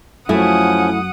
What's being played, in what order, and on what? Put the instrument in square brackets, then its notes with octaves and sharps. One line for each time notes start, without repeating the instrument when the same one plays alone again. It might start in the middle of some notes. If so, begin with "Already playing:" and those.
[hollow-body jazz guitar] F#2 [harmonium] F3 C#4 [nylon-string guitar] A3 E4 [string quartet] F#5 D#6